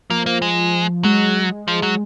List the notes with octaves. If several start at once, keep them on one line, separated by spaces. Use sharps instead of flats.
F3 A#3
A#3
G#3
F#3 G#3
F3
F#3